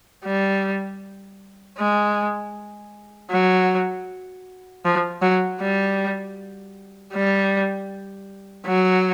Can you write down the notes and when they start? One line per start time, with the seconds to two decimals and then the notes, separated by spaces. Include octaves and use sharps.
0.25 G3
1.78 G#3
3.31 F#3
4.85 F3
5.22 F#3
5.61 G3
7.13 G3
8.67 F#3